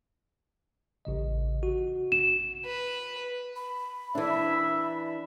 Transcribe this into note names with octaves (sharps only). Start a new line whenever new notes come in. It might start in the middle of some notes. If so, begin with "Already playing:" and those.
A1 C#3 D#5
F#4
E7
B4
B5
E3 D4 E5